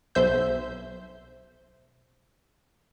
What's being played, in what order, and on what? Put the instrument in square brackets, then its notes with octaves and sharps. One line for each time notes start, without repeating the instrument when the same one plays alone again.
[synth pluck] B1 C5 E5 G6